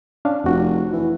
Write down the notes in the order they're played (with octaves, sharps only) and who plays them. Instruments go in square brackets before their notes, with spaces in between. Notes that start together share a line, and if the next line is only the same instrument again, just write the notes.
[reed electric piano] C#4 D4 F5
[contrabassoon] F1 [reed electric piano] F2 F#4
[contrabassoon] E3